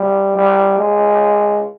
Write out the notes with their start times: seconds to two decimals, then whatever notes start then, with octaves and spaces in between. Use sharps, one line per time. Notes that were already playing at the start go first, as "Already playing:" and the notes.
Already playing: G3
0.36 G3
0.78 G#3